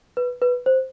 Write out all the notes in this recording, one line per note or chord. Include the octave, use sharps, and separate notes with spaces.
B4
B4
C5